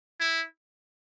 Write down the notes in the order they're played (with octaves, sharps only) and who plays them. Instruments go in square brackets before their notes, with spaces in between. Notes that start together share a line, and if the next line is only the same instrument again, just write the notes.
[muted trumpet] E4